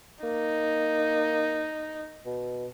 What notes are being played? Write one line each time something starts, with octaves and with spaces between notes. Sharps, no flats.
A#3 D#4
B2